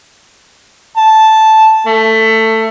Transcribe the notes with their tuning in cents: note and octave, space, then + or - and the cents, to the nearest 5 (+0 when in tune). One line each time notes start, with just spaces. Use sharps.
A5 -5
A3 +15